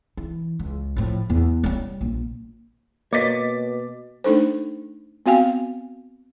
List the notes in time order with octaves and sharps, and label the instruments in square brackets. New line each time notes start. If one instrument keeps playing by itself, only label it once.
[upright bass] E3
C#2
A2 F3
E2
G3 C#4
A#1
[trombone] B2 [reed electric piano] A#3 [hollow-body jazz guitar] C#5 D#5 [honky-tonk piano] D6 A6 B6
[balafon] A3 D4 D#4 A4 C5
B3 C4 F#4 F5 G5 G#5